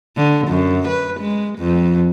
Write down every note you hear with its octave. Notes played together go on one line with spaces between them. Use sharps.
D3
F#2
B4
G#3
F2